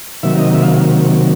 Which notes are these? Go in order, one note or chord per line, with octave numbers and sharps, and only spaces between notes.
C3 D#3 F#3 A#3 E5
D#5
E5
F5